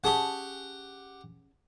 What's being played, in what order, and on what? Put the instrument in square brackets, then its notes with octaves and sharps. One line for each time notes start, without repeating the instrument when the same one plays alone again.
[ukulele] C#4 G#4 A5 [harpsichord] G4 F#5